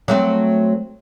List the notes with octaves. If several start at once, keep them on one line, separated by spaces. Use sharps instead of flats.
F#3 A3 C4